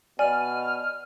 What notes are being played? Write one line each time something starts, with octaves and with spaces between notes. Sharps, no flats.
B2 D5 G#5 F6 D#7